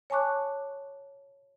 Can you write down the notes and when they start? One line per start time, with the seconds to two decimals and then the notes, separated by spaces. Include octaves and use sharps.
0.10 C#5 G#5 A5 C#6 D6 F#6